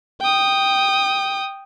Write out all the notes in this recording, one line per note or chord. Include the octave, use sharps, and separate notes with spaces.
G5 D#6